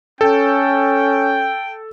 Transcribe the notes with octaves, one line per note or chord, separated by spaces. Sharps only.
C#4 A4 G5